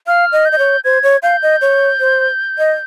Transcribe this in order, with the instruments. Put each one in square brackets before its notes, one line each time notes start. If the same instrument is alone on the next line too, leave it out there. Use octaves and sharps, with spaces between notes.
[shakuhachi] F5 [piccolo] F6
[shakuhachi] D#5
[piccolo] G6
[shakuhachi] D#5
C#5
[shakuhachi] C5 [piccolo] G#6
[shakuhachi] C#5
[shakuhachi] F5 [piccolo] G6
[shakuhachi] D#5
C#5
C5
D#5